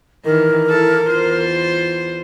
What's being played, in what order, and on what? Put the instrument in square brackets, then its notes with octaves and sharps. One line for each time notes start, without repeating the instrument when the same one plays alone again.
[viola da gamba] D#3 E3 [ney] A#4
[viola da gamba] E4 A4
E2 F4 C5